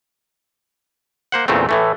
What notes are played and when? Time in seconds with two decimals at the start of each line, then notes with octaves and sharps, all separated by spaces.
1.32 A#3 C5 F#5
1.48 E2 A#2 C#3 A3 C4
1.69 A2 E3 A3